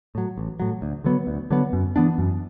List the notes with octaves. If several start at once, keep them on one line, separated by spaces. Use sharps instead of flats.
A2 F#3
A1
A2 F#3
D2
D3 F#3 B3
D2
D3 F#3 B3
F#2
E3 B3 D4
F#2